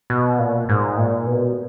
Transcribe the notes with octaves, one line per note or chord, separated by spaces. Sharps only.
B2
A#2
G#2
A#2
B2